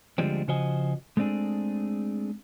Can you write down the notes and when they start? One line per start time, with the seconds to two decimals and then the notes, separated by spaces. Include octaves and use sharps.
0.18 D2 D3 F3 G3 G#3 C4
0.48 C#3 F3 F#4 C5 D#5 G#5
1.17 G#3 A3 C4 D4 G#4